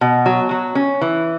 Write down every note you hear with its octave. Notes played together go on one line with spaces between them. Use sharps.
B2
F#3
F#3
C#4
E3